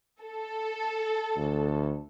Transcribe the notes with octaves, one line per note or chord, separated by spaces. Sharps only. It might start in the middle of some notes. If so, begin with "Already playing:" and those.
A4
D2